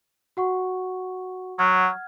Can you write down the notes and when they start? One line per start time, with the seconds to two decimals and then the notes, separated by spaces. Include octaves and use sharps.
0.37 F#4 F#5 C#6
1.59 F#3 F#5 F6 G#6